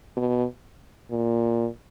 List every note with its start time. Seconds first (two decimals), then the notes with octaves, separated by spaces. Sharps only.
0.16 B2
1.11 A#2